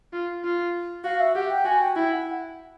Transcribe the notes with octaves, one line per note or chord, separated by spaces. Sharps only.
F4
F4
F#4 F5
E5
G4 F#5
G5
F#4 G#5
G5
E4 G5
F#5